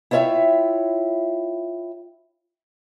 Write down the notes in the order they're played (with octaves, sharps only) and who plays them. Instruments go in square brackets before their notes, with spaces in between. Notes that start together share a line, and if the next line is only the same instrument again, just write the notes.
[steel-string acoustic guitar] E4 F4 C#5 D#5 E5 G5